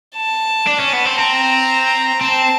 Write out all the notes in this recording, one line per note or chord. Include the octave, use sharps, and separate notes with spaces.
A5
D4
C#4
B3
C4
C4 A#5
C4 A5